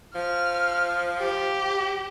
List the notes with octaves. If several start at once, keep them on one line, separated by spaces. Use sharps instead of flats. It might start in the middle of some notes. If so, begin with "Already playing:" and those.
F3 F6
G4